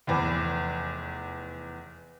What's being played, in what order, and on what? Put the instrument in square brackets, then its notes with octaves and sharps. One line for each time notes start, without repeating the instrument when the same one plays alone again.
[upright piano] F1 E2